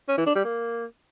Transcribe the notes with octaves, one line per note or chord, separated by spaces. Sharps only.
C#4
E3
D4
G3
A#3